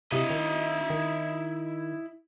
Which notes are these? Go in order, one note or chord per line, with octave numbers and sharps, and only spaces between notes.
C3 E4 D#5
D#3
D#3